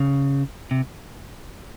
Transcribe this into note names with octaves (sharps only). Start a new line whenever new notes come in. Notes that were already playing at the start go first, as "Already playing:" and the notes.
Already playing: C#3
C3